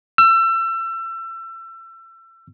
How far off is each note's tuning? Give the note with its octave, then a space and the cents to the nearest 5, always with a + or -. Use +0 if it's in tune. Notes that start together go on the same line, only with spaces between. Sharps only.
E6 +30